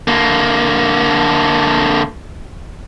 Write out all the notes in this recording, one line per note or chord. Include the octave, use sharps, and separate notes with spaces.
D3 A#3